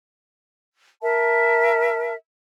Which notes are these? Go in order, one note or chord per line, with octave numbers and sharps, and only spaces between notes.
A#4 E5 A5